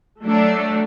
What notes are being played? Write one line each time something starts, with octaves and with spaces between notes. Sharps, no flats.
F#3 A3 D4